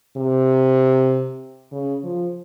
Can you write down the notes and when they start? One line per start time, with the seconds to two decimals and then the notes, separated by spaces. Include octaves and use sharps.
0.17 C3
1.72 C#3
2.04 F3